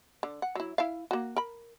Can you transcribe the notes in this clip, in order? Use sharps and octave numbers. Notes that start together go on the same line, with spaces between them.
D3
F#5
F#3 E4
E4 E5 F5
A#3 F#4
A#4 B5